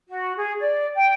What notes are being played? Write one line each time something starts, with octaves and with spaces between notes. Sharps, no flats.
F#4
G#4
D5
G5